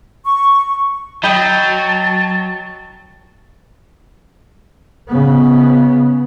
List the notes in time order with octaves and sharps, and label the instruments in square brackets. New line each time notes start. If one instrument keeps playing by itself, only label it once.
[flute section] C#6
[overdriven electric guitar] F#3 [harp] D#5 G5 B5 [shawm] A5
[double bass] C#3 B3